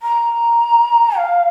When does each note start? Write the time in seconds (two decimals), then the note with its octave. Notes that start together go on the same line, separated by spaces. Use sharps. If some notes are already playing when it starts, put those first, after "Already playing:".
0.02 A#5
1.17 F5